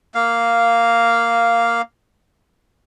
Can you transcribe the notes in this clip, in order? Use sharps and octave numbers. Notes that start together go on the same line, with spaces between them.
A#3 F5